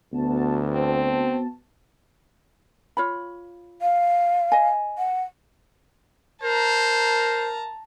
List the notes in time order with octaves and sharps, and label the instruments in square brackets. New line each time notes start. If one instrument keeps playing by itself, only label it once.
[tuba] D2 [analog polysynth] B3 F#4 A5
[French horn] C4
[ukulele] F4 C#5 B5
[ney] F5
[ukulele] D#5 G#5
[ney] F#5
[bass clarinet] A#4 [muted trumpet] C5 [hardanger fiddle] A5 A#5